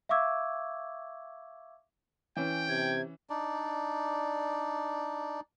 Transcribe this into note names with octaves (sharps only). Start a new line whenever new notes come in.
E5 F5 C#6 D6 E6 G#6
E3 C#4 G5
C3 G#6
D4 D#4 D5